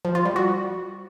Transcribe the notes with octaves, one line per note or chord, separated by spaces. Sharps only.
F3
F4
G3
F#4